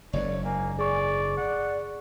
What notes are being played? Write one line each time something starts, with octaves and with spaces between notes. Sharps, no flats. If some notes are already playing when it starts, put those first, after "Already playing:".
F#1 G#2 C#5 D5
A#3 G#5
G#4 D5 C#6
D5 F#5